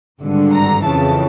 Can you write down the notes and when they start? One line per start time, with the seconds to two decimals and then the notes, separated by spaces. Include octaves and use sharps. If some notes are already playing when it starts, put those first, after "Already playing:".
0.21 G#1 G2 D3
0.54 A#5
0.84 F2 C#3 E3 A5